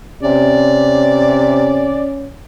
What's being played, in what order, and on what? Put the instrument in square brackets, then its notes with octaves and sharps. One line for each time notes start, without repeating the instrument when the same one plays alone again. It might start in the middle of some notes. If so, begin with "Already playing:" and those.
[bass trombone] C3 [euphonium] C#4 [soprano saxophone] D5